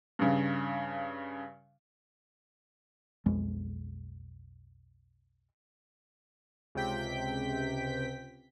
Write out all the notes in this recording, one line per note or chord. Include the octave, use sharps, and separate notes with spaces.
G2 C#3
B1 F2 G#3
C#2 C3 G5 B6